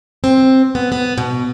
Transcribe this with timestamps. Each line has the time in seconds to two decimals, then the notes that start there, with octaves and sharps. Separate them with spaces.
0.24 C4
0.75 B3
0.92 B3
1.18 B2